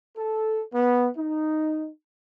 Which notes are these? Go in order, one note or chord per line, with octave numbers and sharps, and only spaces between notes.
A4
B3
D#4